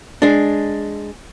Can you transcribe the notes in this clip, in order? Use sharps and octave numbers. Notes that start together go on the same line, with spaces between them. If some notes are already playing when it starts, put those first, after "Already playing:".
G#3 D4